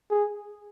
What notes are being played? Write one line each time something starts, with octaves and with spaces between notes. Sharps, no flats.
G#4